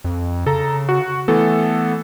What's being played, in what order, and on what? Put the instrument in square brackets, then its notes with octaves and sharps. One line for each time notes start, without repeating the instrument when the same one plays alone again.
[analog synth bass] F2
[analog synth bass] C#3 [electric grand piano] A4 A#5
[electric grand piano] F#4
[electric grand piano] E3 A3 A4 [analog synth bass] B3